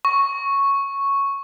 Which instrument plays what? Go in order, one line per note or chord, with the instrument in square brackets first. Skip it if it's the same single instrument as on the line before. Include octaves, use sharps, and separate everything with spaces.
[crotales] C#6